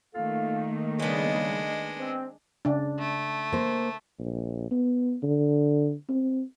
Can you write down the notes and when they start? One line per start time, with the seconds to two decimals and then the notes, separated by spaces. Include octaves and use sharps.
0.15 D#3 A3 A#3 F4 A4 F5
0.99 C#3 G3 G#3 B3 D4 D#5
1.98 C4
2.65 C#3 D4
2.99 A3
3.53 A#3 C5
4.19 A#1
4.71 B3
5.23 D3
6.09 C4